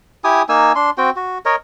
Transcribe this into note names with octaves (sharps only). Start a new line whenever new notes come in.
E4 G4 G#5 D#6
A#3 D#4 G#5 E6
D4 C6
C4 F#4 G5
F#4
A#4 C#5 D#5